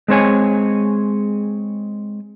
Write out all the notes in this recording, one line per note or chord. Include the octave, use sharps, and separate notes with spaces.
G#3 C4 C#5 G#5